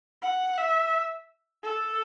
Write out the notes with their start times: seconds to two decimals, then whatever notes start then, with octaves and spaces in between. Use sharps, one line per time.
0.22 F#5
0.58 E5
1.63 A4